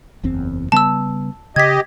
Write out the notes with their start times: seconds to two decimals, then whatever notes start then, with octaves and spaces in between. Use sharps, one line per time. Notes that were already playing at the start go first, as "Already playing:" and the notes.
0.23 F#1 E2 C4
0.72 C#3 G3 B3 A5 E6
1.56 C#3 G4 D#5 G#6 B6